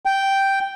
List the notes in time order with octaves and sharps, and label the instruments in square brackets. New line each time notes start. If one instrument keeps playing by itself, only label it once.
[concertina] G5